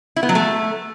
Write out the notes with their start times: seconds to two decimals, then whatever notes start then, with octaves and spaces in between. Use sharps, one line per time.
0.16 E4
0.23 B3
0.29 F#3
0.35 A3